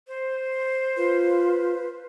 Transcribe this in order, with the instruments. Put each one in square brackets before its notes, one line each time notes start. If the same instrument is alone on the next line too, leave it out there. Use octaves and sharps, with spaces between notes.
[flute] C5
[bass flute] F4 [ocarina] B4